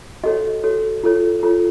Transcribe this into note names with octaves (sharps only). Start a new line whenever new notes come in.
F#4 A4 C#5 D#5
F#4 A4 C#5
F4 A4 C#5
F4 A4 C#5